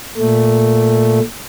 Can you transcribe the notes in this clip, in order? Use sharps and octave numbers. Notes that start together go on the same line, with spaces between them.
A#2 A3